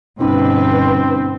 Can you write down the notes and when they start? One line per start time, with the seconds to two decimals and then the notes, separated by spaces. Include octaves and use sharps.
0.20 G1 B2 C4 C#4 D#4 B4 B5